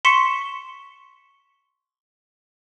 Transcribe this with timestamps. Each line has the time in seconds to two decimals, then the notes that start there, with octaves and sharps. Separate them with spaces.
0.05 C6 C#6 B6 C#7 E7 G7